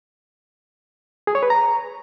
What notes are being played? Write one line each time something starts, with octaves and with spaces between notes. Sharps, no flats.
G#4
C#5
B4
A#5